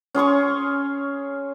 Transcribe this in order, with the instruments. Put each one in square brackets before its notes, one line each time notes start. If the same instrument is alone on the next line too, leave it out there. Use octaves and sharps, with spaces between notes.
[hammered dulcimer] C#4 G#4 C6 C#6